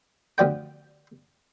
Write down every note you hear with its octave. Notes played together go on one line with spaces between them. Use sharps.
D2 F3 D5 G5